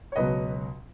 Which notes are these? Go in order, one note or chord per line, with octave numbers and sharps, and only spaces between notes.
C#5
C#2 B2 F#3 B4 D#5